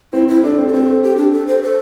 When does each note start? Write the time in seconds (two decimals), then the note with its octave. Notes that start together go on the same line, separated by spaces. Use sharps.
0.13 C4 E4
0.28 E4
0.43 D4 A4
0.58 C4
0.68 G4
0.73 C4 A4
1.03 G4
1.17 D4
1.32 A4
1.47 C5
1.63 A4